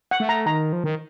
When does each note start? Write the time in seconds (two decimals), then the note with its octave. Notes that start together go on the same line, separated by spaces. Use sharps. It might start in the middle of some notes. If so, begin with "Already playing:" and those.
0.11 F#5
0.20 A3
0.29 A#5
0.46 D#3 A#5
0.73 F3
0.84 D#3